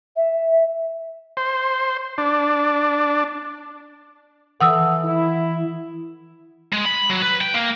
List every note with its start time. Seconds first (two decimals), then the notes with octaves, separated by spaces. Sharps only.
0.17 E5
1.37 C5
2.18 D4
4.61 E3 A4 F#5 D#6 E6
5.04 E4
6.73 G#3
6.85 B5
7.09 F#3
7.22 B4
7.41 G5
7.54 A#3